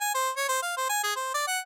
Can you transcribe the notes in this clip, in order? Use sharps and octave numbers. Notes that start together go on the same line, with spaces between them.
G#5
C5
C#5
C5
F5
C5
G#5
G#4
C5
D5
F#5